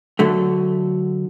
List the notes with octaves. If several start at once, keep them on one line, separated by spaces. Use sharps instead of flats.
D3 F#3 A3